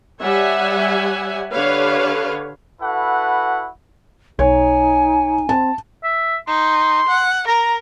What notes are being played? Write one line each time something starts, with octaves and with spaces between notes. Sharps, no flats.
G3 C#5 E5 F#5 G#5
D3 G4 B4 C#5 F5
E4 F#4 A4 B4 F#5
B1 D#4 C#5 G#5
C4 A5
E5
D#4 C6
F#5
A#4 A#5